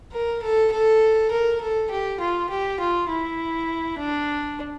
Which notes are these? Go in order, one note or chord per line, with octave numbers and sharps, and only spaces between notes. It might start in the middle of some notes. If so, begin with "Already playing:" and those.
A#4
A4
A4
A#4
A4
G4
F4
G4
F4
E4
D4